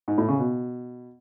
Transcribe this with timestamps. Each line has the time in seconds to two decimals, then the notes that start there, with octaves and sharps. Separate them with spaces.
0.08 G#2
0.18 A2
0.28 C#3
0.39 B2